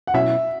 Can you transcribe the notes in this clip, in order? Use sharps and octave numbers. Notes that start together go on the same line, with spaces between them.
F#5
B2 F#3 C#4 E4 E5